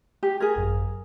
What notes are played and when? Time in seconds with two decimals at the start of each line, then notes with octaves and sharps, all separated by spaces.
0.23 G4
0.40 G#4 A#4 G#6
0.56 G#1 F#2